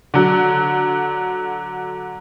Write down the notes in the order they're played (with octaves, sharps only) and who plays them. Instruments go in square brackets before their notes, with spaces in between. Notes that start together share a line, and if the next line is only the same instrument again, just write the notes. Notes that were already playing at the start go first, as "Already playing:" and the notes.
[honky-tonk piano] D3 F#3